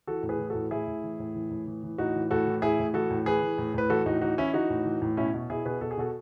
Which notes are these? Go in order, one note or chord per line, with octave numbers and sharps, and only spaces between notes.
E3 F#4 A4
A2
G#4 B4
E3
A2 F#4 A4
A2 E4 G#4
A2
E3
A2
E3
A2
E3
E3
A2 D#4 F#4
E3
A2 F#4 A4
E3
A2 E4 G#4
A2
E3 F#4 A4
A2
E3 G#4 B4
E3
A2
A2 B4
E3 F#4 A4
A2 D#4 F#4
E3 D#4 F#4
E3 C#4 E4
E3 D#4 F#4
A2
E3
A2
B2 C#4 E4
B2
B2 E4 G#4
B2 G#4 B4
B2 A4
G#4
B2 F#4 A4